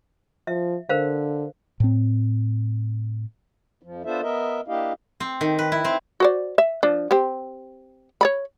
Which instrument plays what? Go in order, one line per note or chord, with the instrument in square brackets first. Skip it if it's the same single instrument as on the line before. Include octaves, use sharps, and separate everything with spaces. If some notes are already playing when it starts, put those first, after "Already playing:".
[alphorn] F3 [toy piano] E5
[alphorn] D3 [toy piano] A#4 C5 F5
[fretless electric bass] A2 C4
[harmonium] F2 F3
B3 D4 F4 A4 C5 E5
B3 A#4 D#5 E5
A#3 D4 E4 G4 D#5 F5
[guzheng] C4
D#3
B4
E4
C4
[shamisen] F#4 C5 D5
E5
F3 D4
C4 G4
C#5 D5 B5